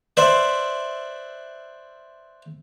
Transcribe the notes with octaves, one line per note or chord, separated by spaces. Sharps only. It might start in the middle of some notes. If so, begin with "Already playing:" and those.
B4 C5 D5 E5